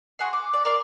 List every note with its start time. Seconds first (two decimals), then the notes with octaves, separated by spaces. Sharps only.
0.19 F#4 G#4 F#5 C6
0.33 D6
0.53 D5
0.65 A#4 D5 C6